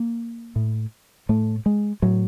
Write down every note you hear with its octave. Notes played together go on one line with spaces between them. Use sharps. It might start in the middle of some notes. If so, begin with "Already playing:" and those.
Already playing: A#3
A2
A2 A3
G#3
A2 F#3